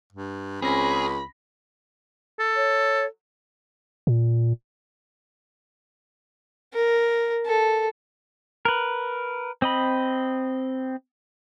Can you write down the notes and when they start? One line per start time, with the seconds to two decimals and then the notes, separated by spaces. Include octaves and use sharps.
0.13 G2
0.62 C#2 C4 C#4 G#4 B5 A#6
2.39 A4
2.55 C#5
4.07 A#2
6.74 A#4
7.46 A4
8.65 A#4 B4
9.62 C4 D#5 B5